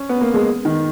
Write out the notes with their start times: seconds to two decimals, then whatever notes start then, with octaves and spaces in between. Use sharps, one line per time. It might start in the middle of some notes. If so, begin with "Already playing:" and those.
Already playing: C#4
0.09 B3
0.21 A#3
0.34 G#3
0.65 D#3